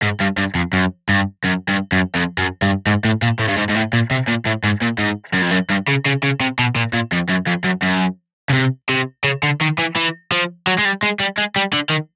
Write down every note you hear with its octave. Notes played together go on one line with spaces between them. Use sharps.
G#2
G2
G2
F2
F#2
G2
F#2
G2
F#2
F2
F#2
G2
G#2
A2
A#2
A2
G2
G#2
G#2
A2
A#2
C3
A#2
A2
G#2
A#2
G#2
F#2
F2
F#2
G2
C#3
C#3
C#3
C3
B2
A#2
A#2
F2
F#2
F2
F#2
F#2
C#3
C3
C3
C#3
D3
D#3
E3
E3
F3
F#3
G#3
G3
G#3
G3
G#3
G3
D3
D#3